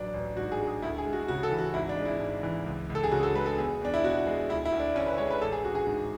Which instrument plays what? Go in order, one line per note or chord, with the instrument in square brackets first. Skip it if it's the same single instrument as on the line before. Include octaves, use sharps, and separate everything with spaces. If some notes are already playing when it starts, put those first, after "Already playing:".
Already playing: [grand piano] A1 F#3 D4
A1
G#2 F#4
G#4
G#3
G#4
D2 E4
G#4
G#3
F#4
C#3 F#4
A4
E3
F#4
G#1 E4
D4
G#3
E4
G#2
E3
C#2
C#2
A4
G#4
C#3 F#4
A4
G#3 B4
A4
E2 G#4
E2 D4
E4
B2 F#4
G#3
D2 E4
E4
D2
D4
D3 C#4
B4
G#3 C#5
B4
A1 A4
G#4
A1 F#4
G#4
G#2